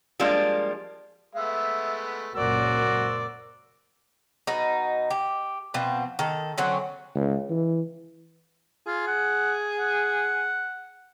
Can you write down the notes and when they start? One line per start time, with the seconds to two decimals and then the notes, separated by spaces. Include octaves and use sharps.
0.20 F3 G3 G#3 A#3 D4 F4
1.35 G#3 A3 B3 E5
2.35 C#2 F#2 A#2 F#4 A#4 C5 D5 E6
4.47 B2 D#4
5.10 G4
5.74 B2 F3 C4
6.19 D#3 A4
6.58 D3 F#3 C4 C#4
7.15 C#2
7.50 E3
8.87 F4 G#4
9.07 F#5
9.79 F#5